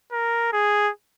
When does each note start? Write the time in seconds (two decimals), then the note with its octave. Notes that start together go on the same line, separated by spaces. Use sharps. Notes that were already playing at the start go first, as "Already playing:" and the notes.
0.12 A#4
0.53 G#4